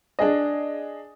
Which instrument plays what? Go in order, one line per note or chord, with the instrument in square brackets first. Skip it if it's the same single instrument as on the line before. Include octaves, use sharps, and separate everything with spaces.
[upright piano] D4 G#4 D#5